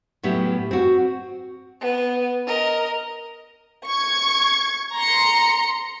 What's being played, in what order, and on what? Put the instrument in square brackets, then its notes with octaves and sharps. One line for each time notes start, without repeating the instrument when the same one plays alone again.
[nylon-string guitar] A2 F#3 B3 C#4 E4 G4
C4 F#4
[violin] B3
A#4 D#5
[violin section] C#6 G#6
A#5 C6 C#7